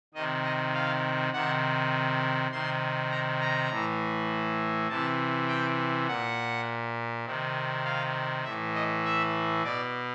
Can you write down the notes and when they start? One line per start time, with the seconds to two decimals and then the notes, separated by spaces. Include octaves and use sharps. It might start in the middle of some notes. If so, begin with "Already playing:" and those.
0.14 C3 D#3 D#5
0.43 D#5
0.74 F5
1.33 C3 D#3 F#5
2.51 C3 D#3 C6
3.11 A#5
3.40 A#5
3.70 A2 E3
4.88 C3 E3 A5
5.48 G5
6.07 A#2 F#5
7.26 C3 D#3
7.85 F5
8.44 A2 E5
8.48 E3
8.74 D#5
9.04 E5
9.63 B2 D5